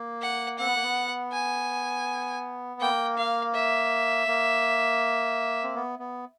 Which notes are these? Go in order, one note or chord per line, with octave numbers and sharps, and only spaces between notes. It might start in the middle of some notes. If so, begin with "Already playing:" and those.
Already playing: A#3
F#5
C4 F#5
B3
A#3
B3
G#5
A#3 G5
F5
E5
A#3
C4
B3
B3